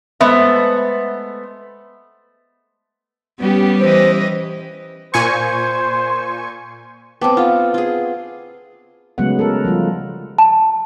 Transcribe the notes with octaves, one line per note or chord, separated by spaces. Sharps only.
G#3 A3 B3 C5 E5
G3 B3 C#4 G4
E3 B4 C5 D#5
A#2 C5 G#5 C#6
B3 C4 G5 A5 D6
F4 A4 F5 F#5 F6
F4 G#4
C#3 F#3 G#3 A3 B3 F#5
A4 A#4
F3 G3 F4
A5